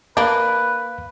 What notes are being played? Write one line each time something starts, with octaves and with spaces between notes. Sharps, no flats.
A#3 D4 B4 F5